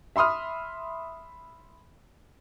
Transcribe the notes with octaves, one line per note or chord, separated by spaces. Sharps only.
E5 B5 C6 D#6 F6